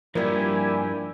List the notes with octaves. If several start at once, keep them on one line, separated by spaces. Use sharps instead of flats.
G2 F3 A#3 E4 G4 A#4 D5 G#5